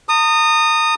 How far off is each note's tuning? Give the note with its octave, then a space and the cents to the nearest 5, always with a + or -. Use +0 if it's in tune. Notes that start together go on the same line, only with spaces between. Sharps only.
A#5 -45 D#6 -15